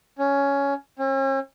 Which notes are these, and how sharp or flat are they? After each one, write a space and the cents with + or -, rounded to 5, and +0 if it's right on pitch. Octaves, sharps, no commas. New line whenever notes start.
C#4 +10
C#4 -45